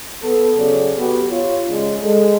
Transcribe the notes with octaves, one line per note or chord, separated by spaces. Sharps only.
B3 A4
C#3 F#3 A4 D5
B3 F#4 G4
F4 C#5
C#3 G#3 D4
G#3 A4